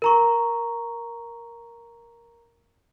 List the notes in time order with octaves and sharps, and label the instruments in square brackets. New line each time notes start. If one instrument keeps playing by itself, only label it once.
[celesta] A#4 A#5 C#6